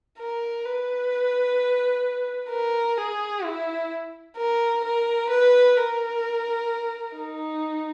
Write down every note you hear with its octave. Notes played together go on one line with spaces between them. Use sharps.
A#4
B4
A#4
G#4
E4
A#4
A#4
B4
A#4
D#4